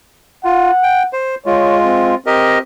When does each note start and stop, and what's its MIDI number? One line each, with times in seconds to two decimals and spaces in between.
0.45 0.71 65
0.45 1.08 78
0.83 1.03 79
1.13 1.35 72
1.46 2.15 56
1.46 2.15 65
1.46 1.77 73
1.84 2.17 60
2.26 2.60 60
2.26 2.59 67
2.26 2.59 70
2.26 2.59 75